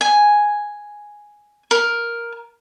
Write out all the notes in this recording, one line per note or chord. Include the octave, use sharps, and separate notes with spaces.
G#5
A#4